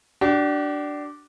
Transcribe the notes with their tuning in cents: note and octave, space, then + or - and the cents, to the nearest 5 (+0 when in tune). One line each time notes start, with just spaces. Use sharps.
D4 +0 G4 -45